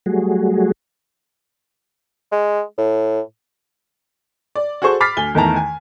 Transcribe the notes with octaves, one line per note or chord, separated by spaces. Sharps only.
F#3 G3 A3 F#4 G#4
G#3
A2
D5
F#4 G#4 A4 C5 C#6
B5 D6 F6 A6 B6 C7
D2 G#5 G7
E2 D#3 A3 A5 A#5
G#5